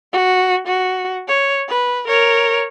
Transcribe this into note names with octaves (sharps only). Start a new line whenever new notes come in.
F#4
F#4
C#5
B4
A#4 C#5